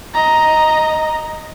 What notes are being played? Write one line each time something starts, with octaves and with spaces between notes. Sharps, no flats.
D#5 A#5